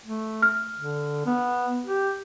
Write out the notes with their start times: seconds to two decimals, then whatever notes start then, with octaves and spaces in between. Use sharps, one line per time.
0.06 A3
0.42 F6
0.76 D3
1.26 B3
1.86 G4